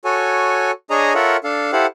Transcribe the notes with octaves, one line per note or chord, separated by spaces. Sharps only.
F#4 A4 C#5 G#5
D4 G#4 C#5 D#5 G#5 A#5
F4 A4 A#4 C#5 E5 F#5
D4 A4 F5
E4 G4 A4 C5 F5 F#5